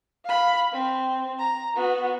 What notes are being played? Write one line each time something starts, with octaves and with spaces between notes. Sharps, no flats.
F5 B5
C4
A#5
B3 F#4